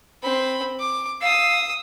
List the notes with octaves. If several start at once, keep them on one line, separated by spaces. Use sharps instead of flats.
C4 B5
D6
F5 D#6 E6